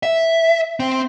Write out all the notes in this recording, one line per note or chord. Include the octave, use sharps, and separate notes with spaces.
E5
C4